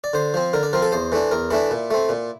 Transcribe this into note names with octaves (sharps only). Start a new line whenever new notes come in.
D5
D3 C5
F3 C4
D3 A#4
D5
F3 C4 A#4
A4
E2 C5
E3 A3 D4
E2 A#4
E3 A3 D4 E4
A#2
A3 C4
A#2